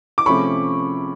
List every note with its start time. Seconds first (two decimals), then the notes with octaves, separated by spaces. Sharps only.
0.18 D6
0.26 C3 F3 A3 C#4 B5 C#6